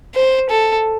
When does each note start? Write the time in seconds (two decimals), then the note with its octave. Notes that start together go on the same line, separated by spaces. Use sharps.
0.15 C5
0.50 A4